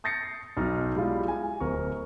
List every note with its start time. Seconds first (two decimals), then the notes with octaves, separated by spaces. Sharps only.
0.04 D#6 G6 A6 A#6 C7 C#7
0.57 B1 F#3 D#4 F6
0.96 G3 G#3 E4 F4
1.28 G#5
1.60 D1 A#4 C5 C#6